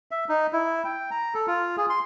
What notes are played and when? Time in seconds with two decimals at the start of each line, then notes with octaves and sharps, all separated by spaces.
0.11 E5
0.29 D#4
0.53 E4
0.85 G5
1.11 A#5
1.34 A4
1.47 F4
1.77 G#4
1.90 C6